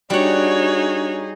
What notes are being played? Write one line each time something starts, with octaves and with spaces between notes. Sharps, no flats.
G3 D4 D#4 F#4 G#4 C#5 F#5